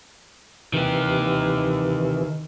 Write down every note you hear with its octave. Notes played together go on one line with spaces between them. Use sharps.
C3 D#3 E3 G4